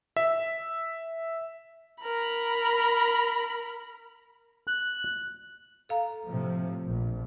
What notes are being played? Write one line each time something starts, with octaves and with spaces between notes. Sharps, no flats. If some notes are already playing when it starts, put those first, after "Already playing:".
E5
A#4 B5
F#6
A4 F5 A#5
A2 C3 F3
A#1